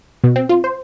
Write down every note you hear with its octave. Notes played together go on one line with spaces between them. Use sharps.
B2
C4
F4
C5